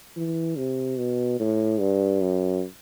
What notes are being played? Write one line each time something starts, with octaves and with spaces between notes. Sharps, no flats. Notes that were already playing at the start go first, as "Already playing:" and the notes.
E3
C3
B2
A2
G2
F#2